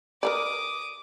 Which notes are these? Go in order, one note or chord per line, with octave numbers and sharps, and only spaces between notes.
A#4 B4 D5 D6 D#6